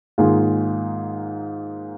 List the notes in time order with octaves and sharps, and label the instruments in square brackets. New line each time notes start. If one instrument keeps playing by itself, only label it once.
[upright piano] G#2 D#3 A#3 F4 G#4